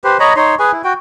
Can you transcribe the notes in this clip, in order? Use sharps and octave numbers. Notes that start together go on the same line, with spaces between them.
G4 B4 C5
C#5 D#5 A#5 B5
D#4 C#5 C6
G#4 B4 G#5
E4
F#4 G5